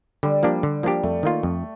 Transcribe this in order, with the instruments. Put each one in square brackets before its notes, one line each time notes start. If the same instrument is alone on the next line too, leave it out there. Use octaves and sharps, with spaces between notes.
[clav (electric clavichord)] D3 [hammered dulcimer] G3
[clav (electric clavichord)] F3 A#3 D4 G4
D3
F3 A#3 D4 G4
[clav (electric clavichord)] F2 [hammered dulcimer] A3
[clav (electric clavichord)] D#3 A#3 F4
F2